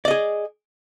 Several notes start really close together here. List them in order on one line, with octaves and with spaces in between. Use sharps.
D5 D#5 G#4